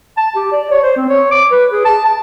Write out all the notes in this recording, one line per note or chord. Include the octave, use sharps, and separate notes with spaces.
A5
G4
D5
C#5
C5
C4
C#5
D6
B4
G#4
A5
A5